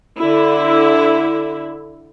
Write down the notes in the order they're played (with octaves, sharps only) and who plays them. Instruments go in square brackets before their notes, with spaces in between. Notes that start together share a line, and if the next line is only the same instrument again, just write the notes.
[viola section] D3 E4